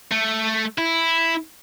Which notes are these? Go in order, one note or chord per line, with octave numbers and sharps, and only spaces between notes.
A3
E4